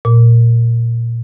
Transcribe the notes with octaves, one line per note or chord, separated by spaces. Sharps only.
A#2